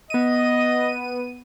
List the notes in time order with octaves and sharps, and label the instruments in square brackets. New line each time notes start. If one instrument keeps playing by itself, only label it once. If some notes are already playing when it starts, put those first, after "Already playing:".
[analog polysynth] B3 D#7 [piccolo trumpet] D#5